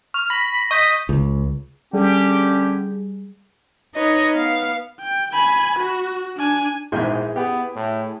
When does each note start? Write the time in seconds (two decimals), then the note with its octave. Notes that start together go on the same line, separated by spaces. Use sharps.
0.14 C#6 F6
0.30 B5 A#6
0.71 D#5 C#6 G6 B6
1.09 C#2
1.93 D3 G3 C#4 G4 G#4
3.95 D#4 B4 C#5 D#5
4.34 B3 F5
5.00 G5
5.33 G#5 B5
5.79 F#4
6.37 D4 G#5
6.92 A#1 G#2 B2 E4 G#4 G5
7.36 B3 G4
7.76 A2